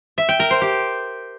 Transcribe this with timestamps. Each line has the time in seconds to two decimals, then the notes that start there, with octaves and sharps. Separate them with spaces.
0.18 E5
0.29 G5
0.40 A#4
0.51 C5
0.61 G4